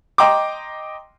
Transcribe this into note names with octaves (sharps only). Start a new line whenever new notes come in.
D#5 G5 A#5 C6 D6